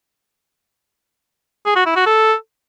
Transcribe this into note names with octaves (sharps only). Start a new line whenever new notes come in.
G#4
F#4
E4
F#4
A4